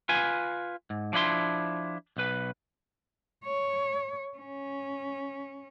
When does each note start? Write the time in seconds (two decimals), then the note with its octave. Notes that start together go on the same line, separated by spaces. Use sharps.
0.09 F4 B4 G#5
0.90 G#2
1.13 F3 D4 E4 C6
2.17 B1 B4
3.45 C#5
4.38 C#4